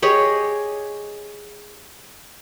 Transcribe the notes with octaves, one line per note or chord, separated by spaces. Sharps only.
G4 G#4 C#5 D#5